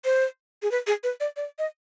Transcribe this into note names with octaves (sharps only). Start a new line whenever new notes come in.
C5
G#4
B4
G#4
B4
D5
D5
D#5